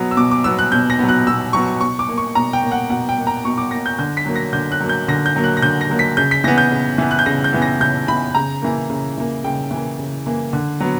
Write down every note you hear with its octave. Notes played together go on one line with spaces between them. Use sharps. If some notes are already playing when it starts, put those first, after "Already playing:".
Already playing: B2 F#3 B3
E6
B2 D6
D6
F#3 B3 E6
F#6
B2 G6
A#6
F#3 B3
F#6
B2 E6
F#3 B3 C#6
B2 C#6
D6
A#3
C#6
B2 A#5
G5
A#3
F#5
B2 F#5
G5
A#3
A#5
B2 C#6
D6
A#3 A#6
G6
D3 G6
B6
F#3 A#3
A#6
D3 G6
F#6
F#3 A#3
G6
D3 A#6
G6
F#3 A#3
F#6
A#6
D3 G6
A#6
F#3 A#3
B6
C#3 G6
B6
E3 B3 A#6
G6
C#3
E3 B3
F#6
G6
C#3 A#6
G6
E3 B3
A#6
C#3 G6
E3 B3 B5
C#3 A#5
E3 A#3
C#3
E3 A#3
C#3 G5
E3
A#3
C#3
E3 A#3
D3
F#3 B3